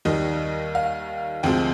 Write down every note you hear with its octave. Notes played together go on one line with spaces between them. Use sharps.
D#2 D#3 G3 D#5
F5
D2 C3 F3 G#3 C4 G5